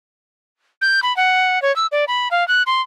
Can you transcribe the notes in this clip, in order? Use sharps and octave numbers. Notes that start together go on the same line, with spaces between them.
G6
B5
F#5
C#5
E6
D5
B5
F5
F#6
C6